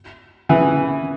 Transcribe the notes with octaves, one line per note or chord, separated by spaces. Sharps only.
C#3 E3